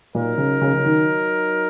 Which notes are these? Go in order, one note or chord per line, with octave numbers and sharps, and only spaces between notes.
A#2 F#3 D#4 A#4
C#3
C#3
C#3
D#3